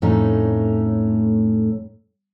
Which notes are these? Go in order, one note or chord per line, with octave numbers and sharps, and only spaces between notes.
F2 A2 A3 C#4 D#4